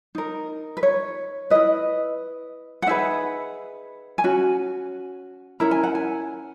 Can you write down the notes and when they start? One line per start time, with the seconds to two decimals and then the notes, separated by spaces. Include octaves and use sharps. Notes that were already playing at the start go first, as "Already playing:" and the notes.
0.15 D#4 A#4
0.77 B4
0.83 C#5
1.50 E4 B4 D#5
2.82 F#5
2.86 D#4 G#4 B4 E5
4.18 G#5
4.24 C#4 F#4
5.60 C#4 E4 A#4 A#5
5.71 G#5
5.83 F#5
5.95 G#5